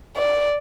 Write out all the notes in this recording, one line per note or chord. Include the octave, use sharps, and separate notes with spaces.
D5